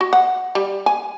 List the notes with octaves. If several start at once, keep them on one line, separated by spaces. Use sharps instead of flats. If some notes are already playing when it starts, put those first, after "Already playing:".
F#4
F#5
G3
G#5